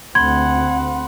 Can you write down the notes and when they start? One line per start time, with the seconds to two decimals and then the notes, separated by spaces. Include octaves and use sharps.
0.15 D2 C4 F#5 B5 C6 G#6